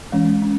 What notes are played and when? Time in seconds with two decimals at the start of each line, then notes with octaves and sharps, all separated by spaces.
0.12 E3 G#3 C#4
0.42 C#4